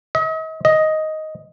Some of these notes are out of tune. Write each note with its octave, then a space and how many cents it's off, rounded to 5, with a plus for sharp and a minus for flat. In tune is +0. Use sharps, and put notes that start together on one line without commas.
D#5 +40
D#5 +5